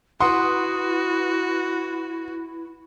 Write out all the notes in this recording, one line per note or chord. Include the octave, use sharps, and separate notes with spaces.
E4 F#4 B4 F#5 C6 D#6